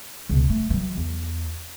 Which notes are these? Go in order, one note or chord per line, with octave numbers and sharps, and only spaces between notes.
C#2 B2
A3
E3 F#3
E2